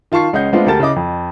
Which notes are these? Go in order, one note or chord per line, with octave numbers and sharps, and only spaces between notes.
D#3 F4 A5 C#6 C7
C#2 C#4 D#5 F#5 G6
G#3 A3 B3 C4 D4 F4
D2 G4 A#4 A5 A6
C#3 E4 D#5 D6
F2